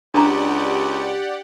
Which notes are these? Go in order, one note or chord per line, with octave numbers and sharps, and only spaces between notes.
C#2 D4 G4 D5 F#5 A#5